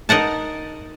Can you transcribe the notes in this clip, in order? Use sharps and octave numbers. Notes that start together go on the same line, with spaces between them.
D#4 A#4 F#5 A5